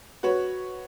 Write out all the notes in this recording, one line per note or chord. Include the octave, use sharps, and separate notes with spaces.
F#4 B4 C#5